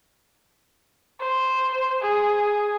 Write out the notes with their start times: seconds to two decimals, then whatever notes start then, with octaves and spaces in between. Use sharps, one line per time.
1.20 C5
2.02 G#4